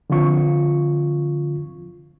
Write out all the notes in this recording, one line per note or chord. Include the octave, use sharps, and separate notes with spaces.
D3 F3 C4 F4 C#6